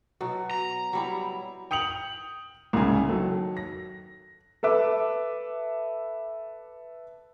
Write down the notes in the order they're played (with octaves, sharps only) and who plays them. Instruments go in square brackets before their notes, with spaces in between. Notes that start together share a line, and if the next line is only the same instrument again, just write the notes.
[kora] B2 F#3
[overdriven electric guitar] A#5
[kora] F#3 G3 E4
[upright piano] G5 D#6 C#7 F7 F#7
C2 G#2 C#3 G#5
D#3 F#3 A4
A#6
A4 B4 E5 D6